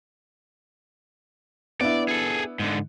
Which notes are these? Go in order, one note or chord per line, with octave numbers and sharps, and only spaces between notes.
B3 D4 E4 D5
G#4 A4
G#2 D3